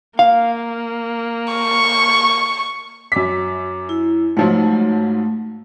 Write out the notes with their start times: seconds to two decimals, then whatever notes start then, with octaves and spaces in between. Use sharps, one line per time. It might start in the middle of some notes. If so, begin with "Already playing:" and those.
0.19 A#3 F5
1.54 C#6
3.12 F#2 D6 B6
3.89 E4
4.37 G#2 F3 F#3 A3